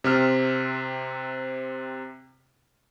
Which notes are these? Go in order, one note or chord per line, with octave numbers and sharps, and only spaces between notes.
C3 C4 F6